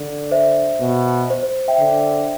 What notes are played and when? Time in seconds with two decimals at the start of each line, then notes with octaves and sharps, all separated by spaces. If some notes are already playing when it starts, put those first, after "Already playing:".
Already playing: D3
0.31 C5 E5
0.81 B2
1.30 C5
1.43 C5
1.68 E5 G5
1.80 D3